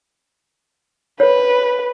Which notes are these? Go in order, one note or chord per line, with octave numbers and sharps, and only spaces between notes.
B4 C#5